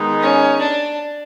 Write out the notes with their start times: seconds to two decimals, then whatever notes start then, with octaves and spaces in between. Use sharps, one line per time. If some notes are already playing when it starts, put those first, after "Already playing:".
Already playing: D#3 G#3 B3 D#4
0.22 C#4
0.60 D4